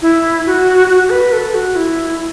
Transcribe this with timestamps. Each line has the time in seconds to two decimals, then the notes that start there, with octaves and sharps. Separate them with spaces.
0.02 E4
0.46 F#4
0.89 F#4
1.10 B4
1.32 A4
1.54 F#4
1.76 E4